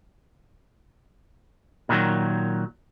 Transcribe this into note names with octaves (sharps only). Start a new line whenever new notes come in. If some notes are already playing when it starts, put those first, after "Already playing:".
A#2 D#3 E3 F#3